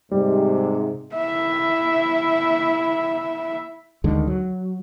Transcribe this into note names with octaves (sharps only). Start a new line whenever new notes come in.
G#2 C3 G3
E4 E5
D2 D3 D#3 G#3
F#3